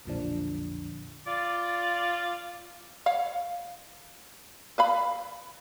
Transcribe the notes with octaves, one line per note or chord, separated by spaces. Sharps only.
B1 F2 A#2 D3 F3 D4
F4 D5
C#5 F5 F#5
B4 F5 B5